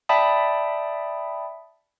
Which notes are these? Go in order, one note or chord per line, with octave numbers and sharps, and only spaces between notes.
D5 E5 G5 A5 B5 D#6